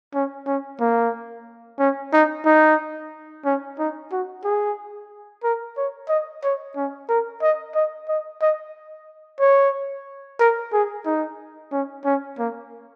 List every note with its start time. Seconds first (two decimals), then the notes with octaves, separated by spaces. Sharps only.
0.14 C#4
0.47 C#4
0.80 A#3
1.79 C#4
2.13 D#4
2.45 D#4
3.45 C#4
3.78 D#4
4.11 F#4
4.44 G#4
5.43 A#4
5.77 C#5
6.09 D#5
6.43 C#5
6.76 C#4
7.09 A#4
7.42 D#5
7.75 D#5
8.08 D#5
8.42 D#5
9.40 C#5
10.40 A#4
10.73 G#4
11.06 D#4
11.72 C#4
12.05 C#4
12.38 A#3